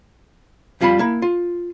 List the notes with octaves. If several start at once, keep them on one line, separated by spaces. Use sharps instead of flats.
F2 G3 F4 A5 B5
A#3 E4
F4